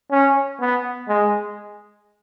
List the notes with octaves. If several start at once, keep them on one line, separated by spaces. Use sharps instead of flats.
C#4
B3
G#3